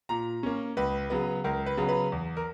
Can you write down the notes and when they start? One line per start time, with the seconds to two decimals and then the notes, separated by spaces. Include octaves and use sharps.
0.09 A#2 A#5
0.43 A#3 C#4
0.77 C#2 B4
1.10 C#3 F#3 B3
1.44 C#2 A#4
1.66 B4
1.77 C#3 F#3 B3
1.89 B4
2.12 E2
2.37 A#4